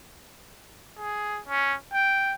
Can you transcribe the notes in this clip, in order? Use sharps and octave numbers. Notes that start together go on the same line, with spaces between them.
G#4
C#4
G5